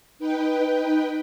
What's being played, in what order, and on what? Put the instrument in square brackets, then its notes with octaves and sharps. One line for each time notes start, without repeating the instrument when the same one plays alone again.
[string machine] D#4 B4 G5